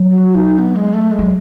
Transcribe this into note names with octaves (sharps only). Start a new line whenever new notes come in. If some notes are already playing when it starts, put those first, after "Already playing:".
Already playing: F#3
F#4
D#4
B3
G#3
A3
G#3
F#3